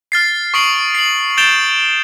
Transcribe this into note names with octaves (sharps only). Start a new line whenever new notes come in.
F6 A6 C7
C#6 D#6 C7 D7 F#7
C7 F#7
G6 A6 D7 E7 F7 G7